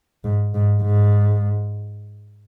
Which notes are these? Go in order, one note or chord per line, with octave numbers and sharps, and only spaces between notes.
G#2
G#2
G#2